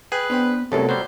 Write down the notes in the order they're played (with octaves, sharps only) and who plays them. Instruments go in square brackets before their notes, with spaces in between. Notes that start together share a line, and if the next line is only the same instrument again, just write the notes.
[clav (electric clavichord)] G#4 [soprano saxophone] B4 [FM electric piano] G5
[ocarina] B3 [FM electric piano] D4 C5 G5
[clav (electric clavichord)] C2 F#2 F#3 [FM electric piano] C3 A3 B3 [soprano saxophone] A4 [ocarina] C#5
[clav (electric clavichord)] F#3 G3 [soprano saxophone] C5